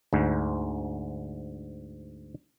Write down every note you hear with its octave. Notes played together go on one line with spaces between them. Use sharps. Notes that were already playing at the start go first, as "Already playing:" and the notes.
D2 G#2